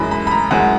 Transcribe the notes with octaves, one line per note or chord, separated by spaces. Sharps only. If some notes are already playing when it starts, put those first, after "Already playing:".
Already playing: F#2 E3 G#3 B5
B5
B5
A#5
F#2 E3 G#3 F#5